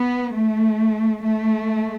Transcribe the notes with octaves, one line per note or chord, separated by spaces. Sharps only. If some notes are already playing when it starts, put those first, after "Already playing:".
Already playing: B3
A3
A3